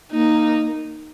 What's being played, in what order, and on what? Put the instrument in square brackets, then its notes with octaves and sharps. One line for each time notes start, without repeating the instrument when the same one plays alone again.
[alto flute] A#3 [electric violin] D#4